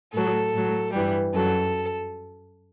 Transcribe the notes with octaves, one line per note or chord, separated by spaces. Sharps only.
A2 F#3 A4
A2 F#3
G2 E3 G3
F#2 F#3 A4